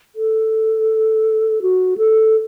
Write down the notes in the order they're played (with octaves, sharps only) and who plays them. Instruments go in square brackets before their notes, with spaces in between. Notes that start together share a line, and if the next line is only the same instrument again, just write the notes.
[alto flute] A4
F#4
A4